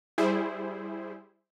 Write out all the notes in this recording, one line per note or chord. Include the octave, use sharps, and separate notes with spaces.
G3 E4 G#4 C5